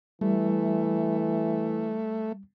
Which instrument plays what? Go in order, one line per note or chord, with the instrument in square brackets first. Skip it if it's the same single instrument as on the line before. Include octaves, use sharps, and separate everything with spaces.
[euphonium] E3 [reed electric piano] G3 [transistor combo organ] A3